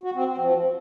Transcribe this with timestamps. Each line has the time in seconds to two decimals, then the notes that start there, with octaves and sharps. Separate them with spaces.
0.03 F#4
0.15 C4
0.27 C4
0.38 F3